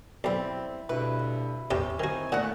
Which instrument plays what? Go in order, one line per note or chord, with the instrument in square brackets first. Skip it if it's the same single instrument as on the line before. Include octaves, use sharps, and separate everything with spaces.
[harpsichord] B1 [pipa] G3 C4 [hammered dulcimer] E4
[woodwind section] D2 G2 B2 [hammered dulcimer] E4 [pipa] B4
[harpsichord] E2 G4 E5 [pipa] C3 [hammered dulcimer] C#4
[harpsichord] D#3 F#4 [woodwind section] C4 D#4 G#5
[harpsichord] A#2 [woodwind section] A3 [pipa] F#4 F#5